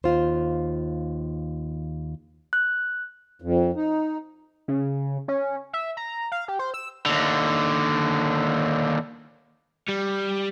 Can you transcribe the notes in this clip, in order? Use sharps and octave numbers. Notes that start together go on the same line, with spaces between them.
D#2 F4 C5
F#6
F2
D#4
C#3
C#4
E5
A#5
F5
G4
C5
E6
D#2 D3
G3